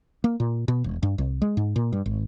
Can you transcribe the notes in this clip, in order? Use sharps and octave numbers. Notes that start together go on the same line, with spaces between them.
A#3
A#2
B2
E1
G2
C2
G#3
G#2
A#2
G2
G#1